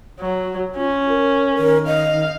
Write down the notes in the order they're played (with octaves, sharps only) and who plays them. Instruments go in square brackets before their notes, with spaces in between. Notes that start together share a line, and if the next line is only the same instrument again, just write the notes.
[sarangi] F#3 [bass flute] F#4
[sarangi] C#4 [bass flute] F4
[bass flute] A#4
[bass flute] D#3 [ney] A#4
[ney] D#5 [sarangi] F5